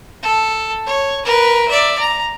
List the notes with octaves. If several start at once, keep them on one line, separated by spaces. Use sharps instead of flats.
A4
C#5
A#4 B4
D5 E5
A#5